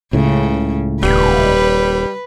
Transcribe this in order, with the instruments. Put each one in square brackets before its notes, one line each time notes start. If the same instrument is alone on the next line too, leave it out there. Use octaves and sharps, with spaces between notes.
[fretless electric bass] C#2 A2 [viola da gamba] C#3
[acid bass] D#1 [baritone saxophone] G3 [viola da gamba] B4